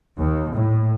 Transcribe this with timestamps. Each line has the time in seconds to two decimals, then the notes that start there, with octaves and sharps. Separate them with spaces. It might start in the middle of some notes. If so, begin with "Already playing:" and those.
0.21 D#2
0.56 A2